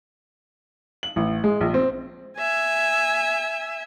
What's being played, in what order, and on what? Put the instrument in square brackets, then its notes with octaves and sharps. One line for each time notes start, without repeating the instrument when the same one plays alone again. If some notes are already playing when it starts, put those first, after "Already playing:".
[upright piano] F#7
A1
G#3
A#1
C4
[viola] E5 G#5